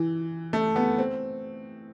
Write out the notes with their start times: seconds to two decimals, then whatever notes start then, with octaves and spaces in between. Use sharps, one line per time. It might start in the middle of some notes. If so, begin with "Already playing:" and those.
Already playing: E3
0.53 A3
0.76 B3
0.99 C4